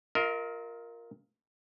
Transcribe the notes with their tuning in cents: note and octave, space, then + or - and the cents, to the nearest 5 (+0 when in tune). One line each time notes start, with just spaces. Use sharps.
F4 +5 A#4 +0 D#5 +45